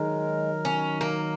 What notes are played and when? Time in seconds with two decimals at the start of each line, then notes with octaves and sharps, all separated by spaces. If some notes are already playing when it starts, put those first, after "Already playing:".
Already playing: D#3 F#3 G#3 D#4 A#4
0.65 C#4
1.01 A#3